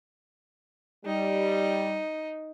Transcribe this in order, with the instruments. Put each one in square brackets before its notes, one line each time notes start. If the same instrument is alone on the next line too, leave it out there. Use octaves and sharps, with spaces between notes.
[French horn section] G3 [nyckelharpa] D#4